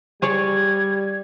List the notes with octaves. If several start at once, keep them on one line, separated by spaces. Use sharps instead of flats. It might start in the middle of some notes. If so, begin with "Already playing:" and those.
G3 G#4 C#5 D5 G#6